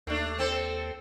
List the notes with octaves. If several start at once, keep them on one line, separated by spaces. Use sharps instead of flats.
D#2 A3 D4
C4 A4 C5